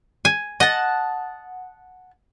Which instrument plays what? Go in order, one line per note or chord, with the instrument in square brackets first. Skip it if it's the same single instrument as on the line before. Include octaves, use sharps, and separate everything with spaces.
[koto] G#5
[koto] D#5 [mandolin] F#5 A5